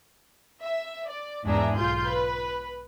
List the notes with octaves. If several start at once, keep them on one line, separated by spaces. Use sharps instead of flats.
E5
D5
E2 G#2 D4 G#4 E5 A#5
B1 F4 C6 G6
B4